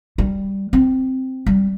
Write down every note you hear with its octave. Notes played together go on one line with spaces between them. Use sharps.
G3
C4
G3